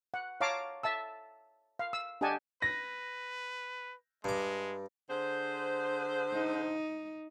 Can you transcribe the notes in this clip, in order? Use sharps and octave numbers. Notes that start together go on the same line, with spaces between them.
F#5
C#5 F5 A5 A#5 D6
E5 A5 E6
F5
E6
D4 G4 D#5 F#5 G#5 A5
B4 A#6
G2 G#3 D6
D3 G#4 C5
D#4